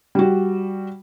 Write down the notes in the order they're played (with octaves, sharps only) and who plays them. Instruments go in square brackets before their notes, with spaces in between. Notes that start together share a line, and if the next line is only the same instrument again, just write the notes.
[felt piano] G3 F#4